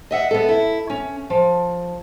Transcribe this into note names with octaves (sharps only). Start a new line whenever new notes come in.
D#5 E5 F#5
B3 A4
E4
C#4
F3